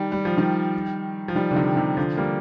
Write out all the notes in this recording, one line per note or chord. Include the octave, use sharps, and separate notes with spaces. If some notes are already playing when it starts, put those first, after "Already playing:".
Already playing: D#3 G3
G3
F3
D#3 G3
F3
D#3 G3
D3
C3 D#3
C3 D#3
D3 F3
G3 A#3